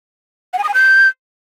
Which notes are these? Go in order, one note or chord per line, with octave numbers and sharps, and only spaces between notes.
F#5
G#5
D#6
G#5
G6